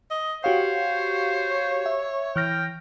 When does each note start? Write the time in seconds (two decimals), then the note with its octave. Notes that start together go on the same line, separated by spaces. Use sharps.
0.11 D#5
0.44 F#4 G4 C5 C#5 F5
1.86 E5
2.36 E3 G5 F6 A#6